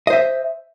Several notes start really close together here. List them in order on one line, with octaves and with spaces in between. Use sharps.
D#5 C5 E5